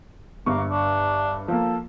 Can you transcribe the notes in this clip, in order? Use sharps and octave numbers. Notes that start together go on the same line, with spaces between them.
G1 G2 A#3 C#6
D4
F3 A#3 A4